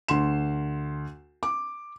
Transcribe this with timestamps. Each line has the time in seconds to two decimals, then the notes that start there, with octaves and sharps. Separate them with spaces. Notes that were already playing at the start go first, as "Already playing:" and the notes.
0.08 D2 C6 E7
1.43 D6